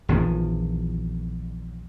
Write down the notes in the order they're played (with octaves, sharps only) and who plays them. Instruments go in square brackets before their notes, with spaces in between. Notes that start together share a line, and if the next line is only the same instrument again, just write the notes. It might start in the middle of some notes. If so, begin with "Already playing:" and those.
[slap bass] A#1 E2 D#3 F3